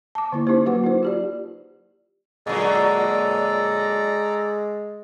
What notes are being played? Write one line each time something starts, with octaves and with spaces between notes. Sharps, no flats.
A5 D6
D3 A#3 E4
C#4 D#4 E4 G4 C5
F#3 A#3 F#4 B4 F#5 D6
D#4 E4 A#4 C5
F4 G4 D5
A#2 D3 F#3 G#3 A4 D5 A#5